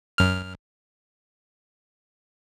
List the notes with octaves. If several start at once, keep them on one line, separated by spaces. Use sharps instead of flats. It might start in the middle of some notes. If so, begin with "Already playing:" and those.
F#2 F6